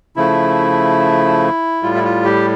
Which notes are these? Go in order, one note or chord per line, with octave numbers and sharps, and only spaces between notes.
C#3 F3 A3 E4
A2 G3 F4
E4
F4
G4